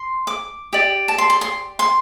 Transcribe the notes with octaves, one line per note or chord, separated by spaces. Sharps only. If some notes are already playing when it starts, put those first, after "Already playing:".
Already playing: C6
D6
G4 D5
A5
C6
C6
C6
C6